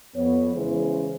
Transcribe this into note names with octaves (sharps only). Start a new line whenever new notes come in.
F2 B3 C#5
C#3 E3 G#3 C#4 G#4 C5